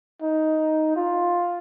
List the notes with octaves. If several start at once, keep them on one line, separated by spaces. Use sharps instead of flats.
D#4
F4